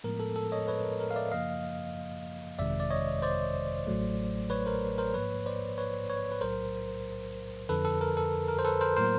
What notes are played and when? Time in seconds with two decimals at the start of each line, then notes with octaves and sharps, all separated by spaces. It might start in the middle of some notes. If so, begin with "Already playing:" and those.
0.04 A2 F3 G#3 B3 A#4
0.20 A4
0.36 A4
0.52 C#5 D#5
0.68 B4 C#5
0.84 A#4
1.00 A#4
1.11 F5
1.15 D5 E5
1.32 F#2 C#3 F3 A#3 D#5 F5
2.59 G1 F2 C3 D#3 G#3 D5 E5
2.80 D5
2.91 C#5 D#5
3.22 C5 D5
3.87 A1 A2 F#3 A3
4.50 B4 C#5
4.66 A#4 C5
4.98 A#4 C5
5.14 G#2 F3 A#3 B4 C#5
5.46 C5 D5
5.78 B4 C#5
6.09 B4 C#5
6.32 B4
6.41 B1 A2 F#3 A#4 C5
7.69 F2 D3 F3 A4 B4
7.85 A4
8.01 A#4
8.17 A4
8.48 A#4
8.59 C5
8.65 A4 B4
8.81 A#4 C5
8.96 A2 F#3 A#3 A#4 C5